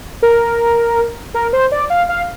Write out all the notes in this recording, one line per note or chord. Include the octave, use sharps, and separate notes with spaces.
A#4
A#4
C5
D5
F5
F5